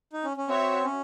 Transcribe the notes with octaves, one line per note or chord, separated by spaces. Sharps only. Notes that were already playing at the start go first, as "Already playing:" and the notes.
D#4
C#4
C#4
C4 F#4 C#5 E5
C#4